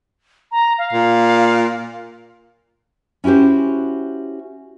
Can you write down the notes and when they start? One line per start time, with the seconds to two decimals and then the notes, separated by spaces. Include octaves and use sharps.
0.51 A#5
0.78 F5
0.93 A#2
3.24 C#4 E4 F#4 G4 C5